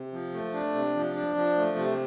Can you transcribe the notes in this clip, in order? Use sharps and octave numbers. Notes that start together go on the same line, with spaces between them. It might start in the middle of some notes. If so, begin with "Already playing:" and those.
Already playing: C3
F3
A3
D4
C3
F3
D4
F3
A3
C3